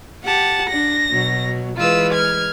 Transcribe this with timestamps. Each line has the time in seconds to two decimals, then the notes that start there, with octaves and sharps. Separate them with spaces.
0.24 G4 F#5 A5
0.70 D4 A#6
1.10 B2 F#3
1.77 E3 G#3 F4 B4 E6
2.13 F6 G#6